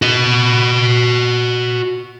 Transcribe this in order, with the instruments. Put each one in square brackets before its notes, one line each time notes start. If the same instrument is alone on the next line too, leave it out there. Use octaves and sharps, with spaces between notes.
[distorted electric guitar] F#4 D#5